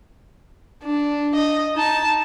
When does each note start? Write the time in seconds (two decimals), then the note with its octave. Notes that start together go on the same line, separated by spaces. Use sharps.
0.84 D4
1.36 D#5
1.75 D#4 A5